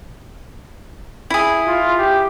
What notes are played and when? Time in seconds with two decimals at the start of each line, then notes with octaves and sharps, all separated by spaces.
1.30 E4 G#4
1.67 F4
1.99 G4